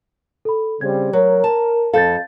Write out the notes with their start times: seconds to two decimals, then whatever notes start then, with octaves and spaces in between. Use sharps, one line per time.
0.45 A4 B5
0.81 C#3 G3 C4 G#6
1.13 F#3 A#4
1.44 A5
1.93 F2 A4 F5 G6 A6